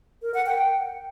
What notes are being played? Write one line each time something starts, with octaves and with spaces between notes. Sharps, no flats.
A#4
F#5
G5